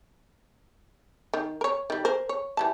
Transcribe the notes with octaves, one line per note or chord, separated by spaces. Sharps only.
D#3
A#4 C#5
D#3 G3
A#4 C5
C#5
E3 G3 A5